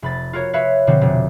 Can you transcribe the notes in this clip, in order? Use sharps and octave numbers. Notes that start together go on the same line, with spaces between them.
F1 B5 A6
F4 F#4 A#4 C#5
B4 C#5 E5 F5 B5
B2 D3 F3 C4 F#4
F1